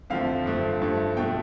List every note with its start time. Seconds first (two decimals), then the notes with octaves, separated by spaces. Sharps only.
0.10 F2 D3 F3 A3 F5
0.46 G2 F3 A3
0.81 G2 F3 A3
1.17 B2 A3 G5